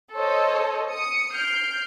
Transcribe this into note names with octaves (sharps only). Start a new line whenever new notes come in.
A4 C5 C#5 D#5
D#6 C#7
F6 G6 C7 D7